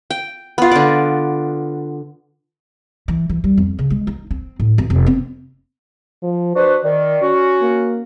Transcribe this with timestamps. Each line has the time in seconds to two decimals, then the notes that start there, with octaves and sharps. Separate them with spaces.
0.11 G5
0.58 B3 F4
0.72 D3 D5
3.08 E3
3.29 E3
3.44 G3
3.57 F2
3.79 C#3
3.90 G#3
4.07 D#4
4.31 C4
4.60 A2
4.78 G#1
4.90 F1
5.06 C4
6.23 F3
6.56 D4 F#4 B4 C5
6.84 D#3 D5
7.21 C#4 F#4
7.62 A#3